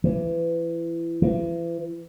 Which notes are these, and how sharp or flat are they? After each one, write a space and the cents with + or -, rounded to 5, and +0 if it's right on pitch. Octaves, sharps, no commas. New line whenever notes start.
E3 +25
E3 +40